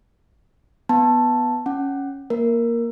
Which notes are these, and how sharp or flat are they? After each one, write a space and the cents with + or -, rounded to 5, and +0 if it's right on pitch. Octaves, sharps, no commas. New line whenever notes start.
B3 +0 A5 +0
C#4 +0 F#5 +15
A#3 +5 A#4 +0